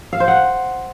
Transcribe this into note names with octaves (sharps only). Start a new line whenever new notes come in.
F5
C5
F#5